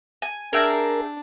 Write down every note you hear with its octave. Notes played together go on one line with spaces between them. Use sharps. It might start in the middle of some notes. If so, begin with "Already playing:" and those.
G#5
D4 G#4 A#4 E5 G5